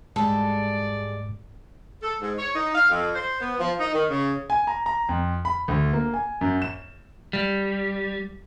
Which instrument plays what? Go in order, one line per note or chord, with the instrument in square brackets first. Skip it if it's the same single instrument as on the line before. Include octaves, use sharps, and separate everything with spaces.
[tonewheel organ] G#2 [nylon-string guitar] G3 G#3 [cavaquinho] A4 [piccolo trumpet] D5
[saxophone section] A4
G#2
C#5
D#4
F5
F2
C5
B3
F3
D#4
D#3
C#3
[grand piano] G#5
A#5
A#5
F2
B5
D2
A#3
G#5
F#2
E7
[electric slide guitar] G3